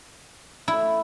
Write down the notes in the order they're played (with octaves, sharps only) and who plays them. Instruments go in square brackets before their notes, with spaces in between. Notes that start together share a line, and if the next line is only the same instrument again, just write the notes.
[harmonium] A3 [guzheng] E4